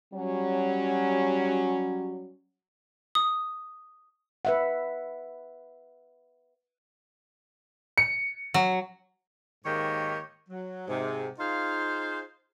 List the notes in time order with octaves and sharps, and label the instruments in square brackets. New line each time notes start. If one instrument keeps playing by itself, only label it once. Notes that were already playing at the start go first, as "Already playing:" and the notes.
[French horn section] F#3 G3 C#4
[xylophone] D#6
[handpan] B4 E5 F#5
[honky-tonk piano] C#7
[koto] F#3
[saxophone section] G#2 D#3 A#3 G4 C#5
F#3
G#2 C3
D#4 F4 G#4 C5 F5